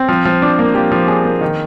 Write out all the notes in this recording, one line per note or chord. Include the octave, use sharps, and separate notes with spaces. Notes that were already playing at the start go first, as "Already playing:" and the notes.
Already playing: C4
F3
F3
D4
A#3
F3 G4
F3
D4 G#4
A#3
D#3